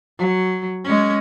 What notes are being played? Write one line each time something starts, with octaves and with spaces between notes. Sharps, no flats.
F#3
G#3 C#4